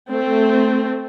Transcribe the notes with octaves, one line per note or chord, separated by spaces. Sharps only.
A3 C4